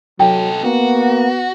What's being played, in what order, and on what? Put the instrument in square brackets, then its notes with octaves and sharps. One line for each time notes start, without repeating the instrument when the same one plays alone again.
[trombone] F#3 [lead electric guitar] D#4 A4 [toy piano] G5
[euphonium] A#3 [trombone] B3 [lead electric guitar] F#4